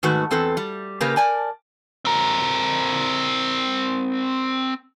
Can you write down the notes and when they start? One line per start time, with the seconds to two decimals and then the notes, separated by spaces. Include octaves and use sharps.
0.03 G#2 D#3 A3 F#4 B4
0.31 E2 C4 A4 B4
0.57 G3
1.01 C#3 A#3 G4 A#4 B4
1.16 A#4 D5 G#5 A5
2.05 C4 A#4